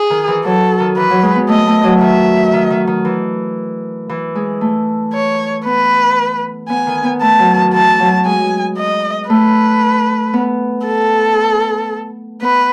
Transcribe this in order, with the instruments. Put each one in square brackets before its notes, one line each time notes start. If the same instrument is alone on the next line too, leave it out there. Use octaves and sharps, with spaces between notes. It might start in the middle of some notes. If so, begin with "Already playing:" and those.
Already playing: [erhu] G#4
[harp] D#3
E3
[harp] F#3 [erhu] A4
[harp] D#3
[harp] E3 [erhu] B4
[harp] F#3
G#3
B3
[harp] A3 [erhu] D#5
[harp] A3
F#3
[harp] D#3 [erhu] E5
[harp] D#3
D#3
D#3
E3
E3
G#3
A3
[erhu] C#5
[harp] B3 [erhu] B4
[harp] B3 [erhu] G#5
[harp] D#3
B3
[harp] A3 [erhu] A5
[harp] F#3
D#3
[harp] E3 [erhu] A5
[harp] F#3
[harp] G#3 [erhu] G#5
[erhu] D#5
[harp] A3 [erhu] B4
[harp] B3
[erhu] A4
[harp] B3 [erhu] B4